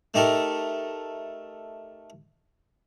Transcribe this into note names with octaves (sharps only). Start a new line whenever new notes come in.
A3 D#4 G4 A4 A#4